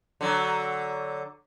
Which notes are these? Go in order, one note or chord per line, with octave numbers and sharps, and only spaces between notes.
D3 F#3